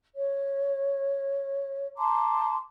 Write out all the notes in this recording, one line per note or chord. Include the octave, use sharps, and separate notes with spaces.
C#5
A5 A#5 C6 D6